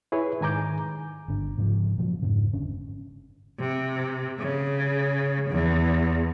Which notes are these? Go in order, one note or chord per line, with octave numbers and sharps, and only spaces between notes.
E4 G#4 B4 C#5
G#2 D#3 G#5 A#5 D6 G6
G1 D3
G#2 C#3 E3 F3
A#2 F3 F#3
F2 G#2 C#3
G1 D3 C#4
C3
C#3
E2